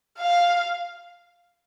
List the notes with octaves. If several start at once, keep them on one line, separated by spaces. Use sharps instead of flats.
F5